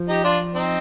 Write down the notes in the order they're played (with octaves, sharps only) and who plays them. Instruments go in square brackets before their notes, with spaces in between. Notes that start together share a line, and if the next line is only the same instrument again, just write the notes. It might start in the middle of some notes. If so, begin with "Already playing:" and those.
Already playing: [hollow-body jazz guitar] F3
[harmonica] D#4 G4
D4 F4
C4 D#4